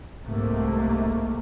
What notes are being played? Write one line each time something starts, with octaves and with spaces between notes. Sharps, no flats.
C2 G#2 C3 A3 A#3